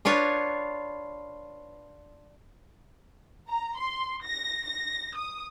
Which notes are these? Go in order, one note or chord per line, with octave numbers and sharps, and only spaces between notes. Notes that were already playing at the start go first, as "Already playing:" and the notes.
D4 F4 B4 C#5
A#5
C6
A#6
A#6
D#6